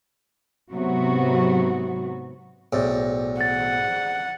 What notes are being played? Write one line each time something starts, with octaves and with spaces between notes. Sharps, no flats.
G#2 C3 F#3 B3 F#4
B1 A2 G#4 C5 D5
F#5 A6